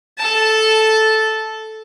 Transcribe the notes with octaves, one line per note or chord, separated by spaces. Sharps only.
A4 A5